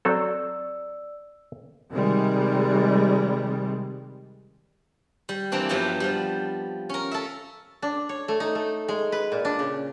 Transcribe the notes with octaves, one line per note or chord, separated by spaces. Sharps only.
F#3 C4 A4 D5 E6
C3 D#3 G3 G#3
G3
E3 A#3 C4 D4
G2 F3 F#3 B3 G4
F3 G3
C#4 A#4
A4 E5
D4
C#5
A3
D#4
A3
G#3
B4
A#2
D4
C#3